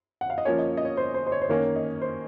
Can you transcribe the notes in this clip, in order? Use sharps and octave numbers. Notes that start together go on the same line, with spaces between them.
F#5
F5
D#5
F3 A#3 C#4 C#5
D#5
D#5
C#5
C5
C5
C5
C#5
C5
D#3 A#3 C#4 C#5
D#5
C5